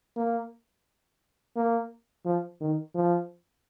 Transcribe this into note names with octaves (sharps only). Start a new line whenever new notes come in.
A#3
A#3
F3
D#3
F3